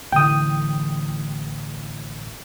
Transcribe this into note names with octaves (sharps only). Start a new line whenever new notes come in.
A1 D3 E3 G5 D#6